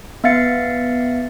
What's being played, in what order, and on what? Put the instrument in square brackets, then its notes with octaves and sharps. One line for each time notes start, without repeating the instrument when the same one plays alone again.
[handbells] B3 E5 F5 A6 C#7